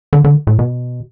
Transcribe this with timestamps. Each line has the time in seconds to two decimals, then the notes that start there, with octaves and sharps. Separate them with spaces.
0.13 D3
0.24 D3
0.47 A2
0.59 B2